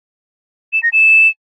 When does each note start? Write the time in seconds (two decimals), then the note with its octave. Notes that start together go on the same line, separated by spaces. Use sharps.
0.73 E7
0.83 A#6
0.93 E7